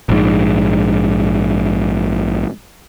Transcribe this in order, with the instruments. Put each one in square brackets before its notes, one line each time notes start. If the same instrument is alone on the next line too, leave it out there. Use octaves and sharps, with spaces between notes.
[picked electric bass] A#1 G#2